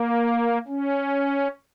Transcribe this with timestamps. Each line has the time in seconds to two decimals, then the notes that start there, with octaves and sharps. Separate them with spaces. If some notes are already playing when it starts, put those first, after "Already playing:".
Already playing: A#3
0.68 C#4